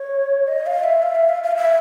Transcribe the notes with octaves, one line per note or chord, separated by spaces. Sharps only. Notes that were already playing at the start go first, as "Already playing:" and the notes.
Already playing: C#5
D#5
F5
E5
F5
E5
F5
F5
E5